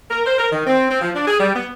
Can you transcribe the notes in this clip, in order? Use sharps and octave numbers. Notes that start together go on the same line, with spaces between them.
A#4
C5
A#4
D#3
C4
C4
F3
D4
G#4
G3
B3